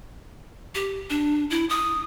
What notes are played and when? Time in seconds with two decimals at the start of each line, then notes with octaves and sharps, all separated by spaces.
0.75 G4
1.10 D4
1.50 E4
1.70 D#6